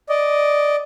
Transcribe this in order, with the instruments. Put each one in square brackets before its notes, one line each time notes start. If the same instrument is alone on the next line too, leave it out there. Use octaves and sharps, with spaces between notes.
[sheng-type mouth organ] D5 D#5